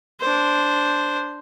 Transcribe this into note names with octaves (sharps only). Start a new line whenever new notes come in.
D4 C5